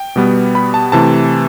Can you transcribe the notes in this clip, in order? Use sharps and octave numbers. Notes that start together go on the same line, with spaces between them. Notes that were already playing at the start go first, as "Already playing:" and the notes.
Already playing: G5
B2 G3 B3
B5
A5
C3 E3 A3 A5